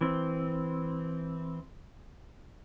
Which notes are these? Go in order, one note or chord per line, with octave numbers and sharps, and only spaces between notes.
E3 C4